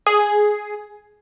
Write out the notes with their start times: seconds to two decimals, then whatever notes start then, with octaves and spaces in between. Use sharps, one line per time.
0.07 G#4